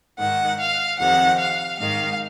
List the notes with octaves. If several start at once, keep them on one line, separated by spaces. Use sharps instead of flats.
G#2 D#3 F#5
F5
F2 C3 D#3 F#5
F5
G#2 D#3 F5